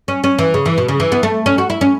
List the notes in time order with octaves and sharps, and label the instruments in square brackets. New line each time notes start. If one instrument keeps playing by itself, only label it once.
[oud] C#4
C#4
E3
C#3
E3
B2
C#3
E3
B3
A3
C#4
F#4
E4
C#4